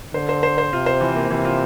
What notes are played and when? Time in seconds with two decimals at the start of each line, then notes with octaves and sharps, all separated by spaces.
0.14 D3 C5
0.29 C5
0.43 C5
0.58 C5
0.72 C3 F4
0.86 C5
1.01 E3
1.15 A#3
1.30 C3 E3
1.45 F4